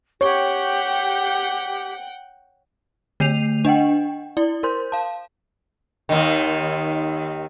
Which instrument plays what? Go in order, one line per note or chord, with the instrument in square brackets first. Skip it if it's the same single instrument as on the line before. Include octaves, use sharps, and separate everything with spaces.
[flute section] G4 [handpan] C#5 [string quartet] F#5 G5
[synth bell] D3 A3 G6 C7 D#7 F7
D4 D#5 F#5 G5
E4 D5
A#4 C5 C6 G6
F5 A5
[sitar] D#2 D#3